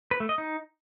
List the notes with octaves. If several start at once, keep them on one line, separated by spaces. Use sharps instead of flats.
B4
A3
D#5
D#4